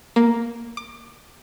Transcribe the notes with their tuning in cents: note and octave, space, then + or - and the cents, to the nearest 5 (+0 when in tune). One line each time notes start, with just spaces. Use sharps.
A#3 +5
D6 +25